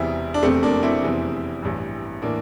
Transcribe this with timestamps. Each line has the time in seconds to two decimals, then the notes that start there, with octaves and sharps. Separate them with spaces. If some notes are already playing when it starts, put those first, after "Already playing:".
Already playing: E1 E2 C3 E3 C4 E4
0.34 D4
0.43 F1 E2 C3 A3 C4
0.63 A#3 D4
0.83 C4 E4
1.02 F1 E2 C3 E3
1.62 A1 G2 E3
2.22 A2 E3 A#3 D4